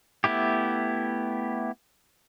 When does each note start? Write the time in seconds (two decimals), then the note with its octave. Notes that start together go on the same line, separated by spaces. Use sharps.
0.24 A3 B3 E4 G4